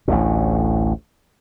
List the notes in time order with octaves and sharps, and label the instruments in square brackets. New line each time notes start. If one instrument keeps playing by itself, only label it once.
[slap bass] A1 D2 A2